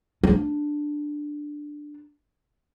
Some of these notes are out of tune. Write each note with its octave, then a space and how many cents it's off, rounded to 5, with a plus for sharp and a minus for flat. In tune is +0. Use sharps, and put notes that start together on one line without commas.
D4 +5